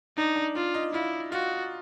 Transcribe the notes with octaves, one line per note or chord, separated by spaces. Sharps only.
D4 D#4
D4
D4 F4
D#4
E4 F4
F4 F#4